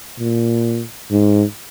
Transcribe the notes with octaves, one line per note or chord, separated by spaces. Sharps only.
A#2
G#2